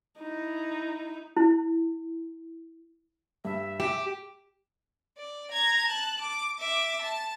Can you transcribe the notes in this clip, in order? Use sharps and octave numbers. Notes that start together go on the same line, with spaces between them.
D#4 E4
E4
G2 E5
G4 E7
D5
A#5 G#6
A5 F#6
D6
E5 D6
A5